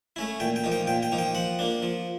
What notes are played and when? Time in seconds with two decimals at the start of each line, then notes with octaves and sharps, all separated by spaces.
0.16 A3 C#4 E4
0.40 A#2 G5
0.56 G5
0.64 F3 A#3 D#4
0.72 G5
0.87 A#2 G5
1.03 G5
1.12 F3 A#3 D#4
1.18 G5
1.35 F3 F#5
1.59 A#3 D4
1.82 F3